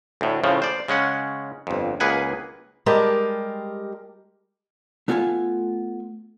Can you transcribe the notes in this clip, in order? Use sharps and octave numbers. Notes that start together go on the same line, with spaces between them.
D2 A2
A2 C#3 F3
C5 D5
C#3 G#3 C#4 F#5
G1 F2
C#2 A#3 G#4 B4 F#5 G#5
G3 G#3 G4 A#4 A5
A3 B3 F4 A4 G#5 A5